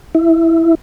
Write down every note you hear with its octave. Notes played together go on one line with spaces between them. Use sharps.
E4